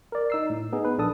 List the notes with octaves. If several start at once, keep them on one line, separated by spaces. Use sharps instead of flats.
A#4 D5
D#4 E6 C7
A2
B3 D#4 G#4
B4
A#1 D4 A4 A5 D#6